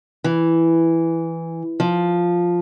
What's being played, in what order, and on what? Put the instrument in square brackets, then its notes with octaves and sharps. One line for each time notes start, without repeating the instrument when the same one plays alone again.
[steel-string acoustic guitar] E3
F3